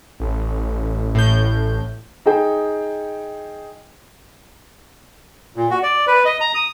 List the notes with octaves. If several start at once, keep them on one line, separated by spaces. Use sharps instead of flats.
A1
A2 G6
D#4 G#4 G5
A#2
F#4
D5
B4
D#5
A#5
D#6